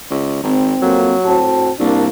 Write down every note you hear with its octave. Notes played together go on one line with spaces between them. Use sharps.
C#2
G#1 C4
F2 F#3 A#3
A2 C4 F#4 A5
C2 A#3 D4